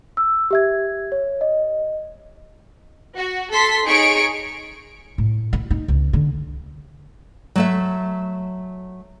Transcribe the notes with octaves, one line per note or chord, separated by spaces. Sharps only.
E6
G4 E5 G#6
C#5
D#5
F#4
A4 C6 B6
D#4 G#4 C#5 C#6 D7
A2
E4
D#4
C#2
D3
F#3 A3 E5